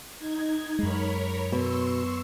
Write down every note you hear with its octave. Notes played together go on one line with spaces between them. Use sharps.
D#4 G#6
F#2 G#3 A#4 C#5 B5
B2 C6 C#6 E6